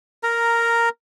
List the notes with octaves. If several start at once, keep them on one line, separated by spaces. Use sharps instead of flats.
A#4 A#5